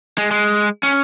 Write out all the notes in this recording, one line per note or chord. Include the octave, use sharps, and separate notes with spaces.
G#3
G#3
C#4